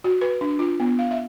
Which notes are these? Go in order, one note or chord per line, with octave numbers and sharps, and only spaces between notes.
F#4
B4
D4
F4
B3
F5
E5